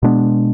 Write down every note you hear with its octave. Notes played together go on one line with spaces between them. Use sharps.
B2 G#3 B3 D4